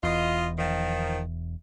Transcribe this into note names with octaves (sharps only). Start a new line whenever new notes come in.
E1 E2 F4 D#5
D#3 F3